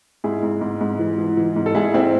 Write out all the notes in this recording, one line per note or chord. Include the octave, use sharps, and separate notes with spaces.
G#2 E4 G#4
G#2
G#2
G#2
E3
E3
E3
G#2
A4
G#2 E4 G#4
G#2 C4 E4